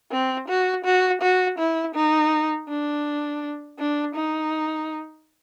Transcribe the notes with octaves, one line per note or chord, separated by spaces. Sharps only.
C4
F#4
F#4
F#4
E4
D#4
D4
D4
D#4